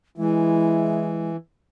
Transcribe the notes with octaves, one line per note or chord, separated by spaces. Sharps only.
E3 G#3 E4